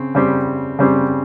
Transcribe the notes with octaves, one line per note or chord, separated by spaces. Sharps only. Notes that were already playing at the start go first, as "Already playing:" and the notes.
Already playing: C#3 C4
C#3 G3 C4
C#3 G3 C4